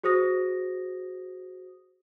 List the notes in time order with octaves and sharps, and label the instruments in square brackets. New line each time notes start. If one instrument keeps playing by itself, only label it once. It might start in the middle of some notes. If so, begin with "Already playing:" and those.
[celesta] F#4 G#4 C5 D#6 A#6